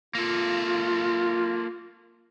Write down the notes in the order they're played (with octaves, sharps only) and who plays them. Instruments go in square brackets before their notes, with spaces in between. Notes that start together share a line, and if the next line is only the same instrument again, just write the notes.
[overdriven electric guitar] A#3 A4 [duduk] F4